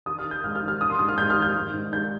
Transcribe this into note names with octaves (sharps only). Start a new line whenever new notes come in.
D#3 D#6
F6
D#3
G6
G#2 F6
D#6
F6
D#3
F6
D#3 D#6
C6
G#2 D#6
F6
G#2 G6
F6
D#3
G6
G#2
G#2
G#2 G6